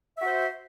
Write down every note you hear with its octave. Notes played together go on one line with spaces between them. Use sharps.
F#4 C5 E5